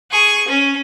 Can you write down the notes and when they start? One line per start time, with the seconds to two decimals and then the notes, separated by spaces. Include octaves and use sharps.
0.11 G#4 C#6
0.48 C#4